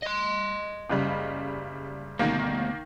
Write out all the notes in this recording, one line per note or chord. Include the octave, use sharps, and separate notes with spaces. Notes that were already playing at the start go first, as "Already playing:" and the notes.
D#5 C6
F#1 C#3 G3
D2 B2 D#3 A#3